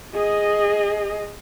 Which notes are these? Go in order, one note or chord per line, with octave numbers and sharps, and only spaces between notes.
G#4 D#5